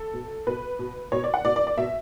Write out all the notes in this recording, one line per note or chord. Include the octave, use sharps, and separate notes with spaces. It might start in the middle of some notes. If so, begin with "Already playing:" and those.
Already playing: A4
B2
B2 B4
B2
B2 C#5
D5
F#5
B2 D5
D5
D5
B2 E5